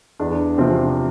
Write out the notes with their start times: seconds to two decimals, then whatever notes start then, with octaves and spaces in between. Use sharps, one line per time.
0.19 E2 D4
0.58 C3 F3 C4